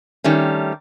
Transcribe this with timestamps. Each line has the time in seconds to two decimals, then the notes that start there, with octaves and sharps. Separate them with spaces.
0.24 D#3 G3 A3 C#4